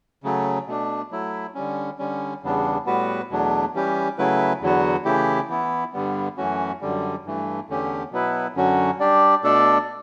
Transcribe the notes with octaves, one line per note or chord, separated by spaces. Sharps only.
C#3 F#3 A3
B2 A3 D4
F#3 A3 E4
D3 G3 C#4
D3 G3 C#4
E2 C#3 G3 B3 D4
A2 G3 B3 F#4 B4
E2 B2 F#3 A3 D4
E3 G3 C#4 G4
C#3 F#3 A3 E4 B4
E2 D3 F#3 B3 F#4
C#3 E3 A3 E4 G4
E3 B3 E4
G2 D3 G3 B3
F#2 E3 A3 C#4 F#4
F#2 D3 G3
G2 E3 A3
E2 D3 A3 C#4 G4
B2 F#3 B3 E4 B4
F#2 D3 F#3 C#4 F#4
G3 D4 G4 D5
B2 A3 D4 A4 D5